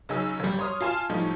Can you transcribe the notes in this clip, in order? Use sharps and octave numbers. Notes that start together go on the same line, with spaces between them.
C#3 F#3 D#4 G#5 E6
G1 G3
C#5 C6 D#6 F6
F4 F5 G#5 A5
A2 F3 G3 D#4